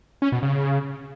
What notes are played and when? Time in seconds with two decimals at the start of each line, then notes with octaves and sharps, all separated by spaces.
0.22 C#4
0.32 B2
0.42 C#3